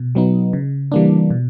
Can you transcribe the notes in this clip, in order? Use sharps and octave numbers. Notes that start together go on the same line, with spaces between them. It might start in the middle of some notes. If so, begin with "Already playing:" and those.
Already playing: B2
F#3 B3 D#4
C#3
E3 G3 A#3 D4
B2